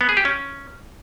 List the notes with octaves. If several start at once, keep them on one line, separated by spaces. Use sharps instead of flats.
B3
G#4
G4
C#4